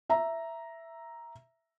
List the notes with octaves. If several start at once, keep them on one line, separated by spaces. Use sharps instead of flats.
E5 A#5